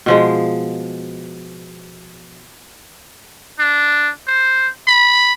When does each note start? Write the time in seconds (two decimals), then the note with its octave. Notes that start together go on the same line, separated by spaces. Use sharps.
0.06 B2 F3 G#3
3.59 D4
4.28 C5
4.88 B5